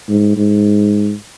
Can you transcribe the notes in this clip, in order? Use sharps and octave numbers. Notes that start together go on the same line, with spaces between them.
G#2
G#2